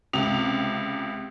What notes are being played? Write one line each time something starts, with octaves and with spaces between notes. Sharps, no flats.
C#2 C3 F7